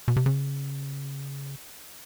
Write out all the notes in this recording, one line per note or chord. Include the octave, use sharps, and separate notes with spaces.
B2
C3
C#3